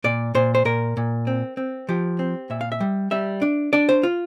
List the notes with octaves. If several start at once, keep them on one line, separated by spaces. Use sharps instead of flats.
A#2 D5
A#2 C5
C5
A#2 A#4
A#2
C4
C4
F3 G4
C4
A#2 E5
F5
E5
G3
G3 E5
D4
D4 D5
C5
F4